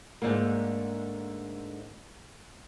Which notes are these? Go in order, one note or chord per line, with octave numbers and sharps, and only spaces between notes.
G#2 B2 D3 A3 A#3